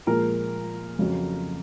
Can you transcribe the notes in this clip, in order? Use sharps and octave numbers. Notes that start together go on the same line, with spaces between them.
A#2 F3 G#3 A#4
F2 C#3 F#3